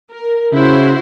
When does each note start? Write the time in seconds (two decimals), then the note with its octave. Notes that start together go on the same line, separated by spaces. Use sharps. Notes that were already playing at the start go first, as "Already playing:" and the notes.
0.11 A#4
0.53 C#3 E4 F#4 C5